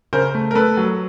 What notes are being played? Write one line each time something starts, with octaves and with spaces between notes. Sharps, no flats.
C#3 A#4 C5
A3
A#4
A3 A4 B4
F#3